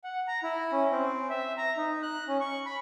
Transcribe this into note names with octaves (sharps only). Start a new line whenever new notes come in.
F#5
A#5
E4
C#4
C4
E5
A#5
D#4
F#6
C#4
C#6
B5